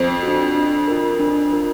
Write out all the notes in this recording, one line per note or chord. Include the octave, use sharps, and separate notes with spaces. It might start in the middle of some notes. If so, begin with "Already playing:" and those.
Already playing: F2 F3
D4 F#4
D4
F4 A#4
D4
F4 A#4